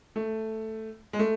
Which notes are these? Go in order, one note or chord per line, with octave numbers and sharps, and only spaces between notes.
A3
G#3
A3